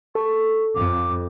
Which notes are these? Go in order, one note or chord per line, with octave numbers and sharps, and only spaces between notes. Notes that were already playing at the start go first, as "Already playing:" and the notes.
A4 C#6
F2 D6